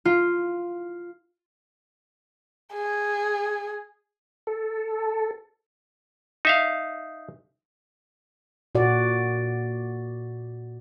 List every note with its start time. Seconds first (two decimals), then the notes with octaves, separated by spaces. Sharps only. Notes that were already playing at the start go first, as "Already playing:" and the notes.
0.05 F4
2.74 G#4
4.47 A4
6.45 D#4 E5 F5
8.75 A#2 F#4 D5